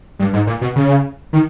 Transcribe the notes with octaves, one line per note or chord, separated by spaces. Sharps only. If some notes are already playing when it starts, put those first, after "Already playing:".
G2
G#2
A#2
B2
C#3
D#3